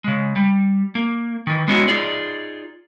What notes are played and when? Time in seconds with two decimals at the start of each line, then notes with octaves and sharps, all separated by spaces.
0.04 C#3 G#3
0.36 G3
0.95 A#3
1.47 D#3 E3
1.68 G#3 B3 C#4 D#4 E4 F#4
1.88 D#4 F4 G#4 D5